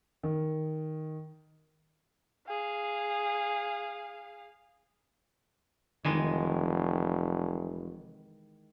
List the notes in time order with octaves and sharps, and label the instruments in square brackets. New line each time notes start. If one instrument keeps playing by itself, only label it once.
[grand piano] D#3
[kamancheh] G#4 F5
[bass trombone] F1 [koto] D#3 E3 G#3